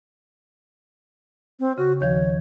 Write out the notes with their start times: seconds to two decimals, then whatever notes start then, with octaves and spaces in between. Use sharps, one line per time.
1.60 C4
1.78 C#3 F#4
2.01 D#2 D#3 F3 C#5